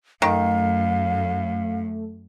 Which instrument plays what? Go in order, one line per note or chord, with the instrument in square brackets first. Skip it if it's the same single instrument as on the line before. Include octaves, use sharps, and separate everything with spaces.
[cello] F#2 [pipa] D#3 [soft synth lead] A3 [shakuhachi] F5